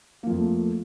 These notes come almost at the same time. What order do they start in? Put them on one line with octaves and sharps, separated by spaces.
A#3 F3 F2 A3